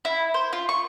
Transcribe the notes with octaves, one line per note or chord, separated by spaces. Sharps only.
E4
C5
F4
C#6